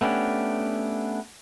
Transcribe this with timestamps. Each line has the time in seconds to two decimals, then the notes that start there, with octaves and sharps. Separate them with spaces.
0.01 A3 B3 C#4 D4 G4